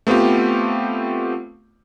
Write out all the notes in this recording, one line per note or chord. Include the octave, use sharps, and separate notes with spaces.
A3 B3 C4 F4 G4